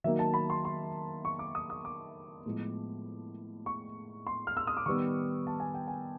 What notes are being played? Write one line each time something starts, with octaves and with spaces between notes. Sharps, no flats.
D#3 F#3 A#3 E5
A5
B5
C6
C6
C#6
D6
D#6
D#6
D6
A2 F3 G#3 B3
C#6
C6
F6
E6
D#6
D6
D#3 G3 B3 C#6
A5
G#5
G5
G#5